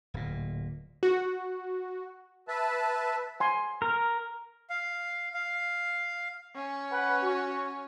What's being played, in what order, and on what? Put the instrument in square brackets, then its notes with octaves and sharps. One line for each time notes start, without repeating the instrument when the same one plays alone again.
[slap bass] D1 A#2
[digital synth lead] F#4
[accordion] B4 E5 A5
[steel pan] G#5 C6
[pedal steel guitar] A#4
[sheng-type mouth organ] F5
F5
[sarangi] C#4
[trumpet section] B4 F#5
F#4